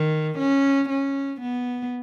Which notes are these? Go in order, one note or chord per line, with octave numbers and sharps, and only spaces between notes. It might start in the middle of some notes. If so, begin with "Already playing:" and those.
Already playing: D#3
C#4
C#4
B3